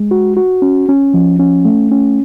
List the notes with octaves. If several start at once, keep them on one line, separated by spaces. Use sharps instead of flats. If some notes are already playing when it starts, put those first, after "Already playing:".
Already playing: G#3
F#4
F#4
C#4
C#4
F3
C#4
A3
C#4